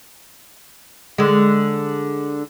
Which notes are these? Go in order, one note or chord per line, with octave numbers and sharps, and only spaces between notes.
D3 G#3